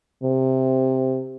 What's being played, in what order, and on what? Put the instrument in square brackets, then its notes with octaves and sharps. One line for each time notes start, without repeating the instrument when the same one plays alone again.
[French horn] C3